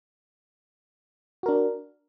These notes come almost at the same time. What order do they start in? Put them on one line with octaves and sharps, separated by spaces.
F#4 A#4 D4